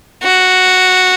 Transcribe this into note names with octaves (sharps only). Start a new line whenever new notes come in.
F#4